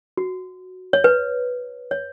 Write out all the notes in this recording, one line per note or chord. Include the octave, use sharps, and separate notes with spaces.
F#4
C#5
B4
C#5